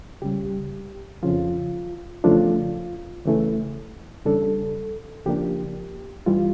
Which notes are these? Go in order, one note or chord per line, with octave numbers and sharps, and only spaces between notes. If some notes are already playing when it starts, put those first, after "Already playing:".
C#2 C#3 G3 G4
F2 C#3 F3 F4
E2 C#3 F3 A3 D4 F4
C#2 C#3 E3 A3
E2 C#3 G3 D4 A4
C#3 F3 A#3 D4 G4
G2 E3 G3 F4